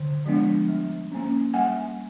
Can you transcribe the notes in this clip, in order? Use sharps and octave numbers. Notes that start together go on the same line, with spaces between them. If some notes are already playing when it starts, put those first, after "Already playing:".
Already playing: D3
F3 G#3 B3 D4
G3
A#3 C#4
G3 F#5 G#5